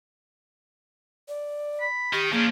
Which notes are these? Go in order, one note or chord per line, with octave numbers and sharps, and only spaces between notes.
D5
B5
D#3 G4
F3 A#3 C#4 D4 G#4